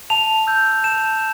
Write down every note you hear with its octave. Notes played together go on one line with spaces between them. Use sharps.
A5 F7
E6 G6
A5 E7